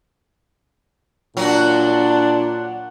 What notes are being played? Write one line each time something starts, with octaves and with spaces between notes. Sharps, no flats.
A#2 F#3 D4 F#4